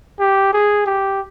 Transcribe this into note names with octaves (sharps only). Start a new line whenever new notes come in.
G4
G#4
G4